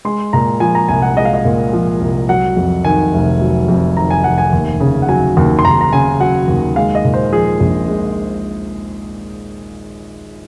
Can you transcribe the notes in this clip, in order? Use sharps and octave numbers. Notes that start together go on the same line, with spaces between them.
G#3 C6
A#2 A#5
F3 G#5
A#5
C2 G#5
F#5
G#3 D#5
F5
D#5
A#2
F3
C2
F#3 F#5
F2
D#3 G#5
F1
F#3
F2
D#3 A#5
G#5
F1 F#5
G#5
D#2
C#3
F#5
F#3 G#5
D#2
C6
D#2 A#5
A#5
C#3 G#5
F#3 F#5
D#2
G#3 F5
D#5
A#2
C5
F3 G#4
A#1
G#3